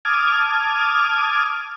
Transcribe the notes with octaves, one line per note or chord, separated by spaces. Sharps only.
A5 D6 D#6 F6 G#6